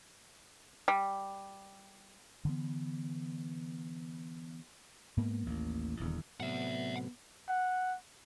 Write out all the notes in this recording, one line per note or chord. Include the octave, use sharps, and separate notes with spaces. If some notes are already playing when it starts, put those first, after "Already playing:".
G3
D3 E3 B3
G#2 A#3 B3
A1 D#2 A#3
D#1 E2 D3
A2 C3 F#3 B3 E5 F#5
F#5